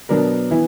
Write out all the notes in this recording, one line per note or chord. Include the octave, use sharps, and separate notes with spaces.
B2 F#3 B3 D4 A#4
E3 B3 E4